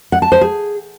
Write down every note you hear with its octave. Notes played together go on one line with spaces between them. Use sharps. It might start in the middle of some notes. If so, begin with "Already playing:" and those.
F#5
A5
C5
G#4